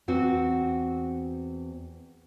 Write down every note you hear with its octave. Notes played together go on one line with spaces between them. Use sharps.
E2 C4 F#4